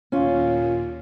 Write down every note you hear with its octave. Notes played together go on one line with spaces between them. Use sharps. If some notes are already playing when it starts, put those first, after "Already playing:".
D#2 A#2 C#4 F4